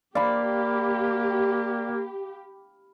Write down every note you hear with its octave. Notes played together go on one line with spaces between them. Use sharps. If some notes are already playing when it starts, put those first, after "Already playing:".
A#3 G4 D5 F5 B5